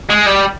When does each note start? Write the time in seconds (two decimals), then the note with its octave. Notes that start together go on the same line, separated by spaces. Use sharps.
0.09 G#3
0.26 G3